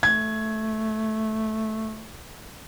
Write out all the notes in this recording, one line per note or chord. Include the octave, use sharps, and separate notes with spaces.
A3 G#6